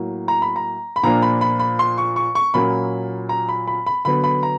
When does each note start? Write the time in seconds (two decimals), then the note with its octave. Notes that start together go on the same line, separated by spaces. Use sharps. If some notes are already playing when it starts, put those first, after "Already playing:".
Already playing: A2 F#3 A#3
0.28 A#5
0.42 B5
0.56 A#5
0.96 B5
1.03 A#2 F3 A#3 D4 A#5
1.22 B5
1.41 B5
1.59 B5
1.79 C6
1.98 C#6
2.16 C#6
2.35 C#6
2.54 A#2 F#3 A#3 C#4 B5
3.29 A#5
3.49 B5
3.67 B5
3.86 B5
4.05 D3 F#3 B3 B5
4.24 B5
4.43 A#5